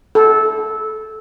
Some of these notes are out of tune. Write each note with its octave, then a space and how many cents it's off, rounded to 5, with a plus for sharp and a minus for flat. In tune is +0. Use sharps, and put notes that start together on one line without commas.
A4 -15